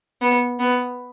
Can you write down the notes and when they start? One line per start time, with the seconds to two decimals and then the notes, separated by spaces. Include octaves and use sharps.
0.22 B3
0.60 B3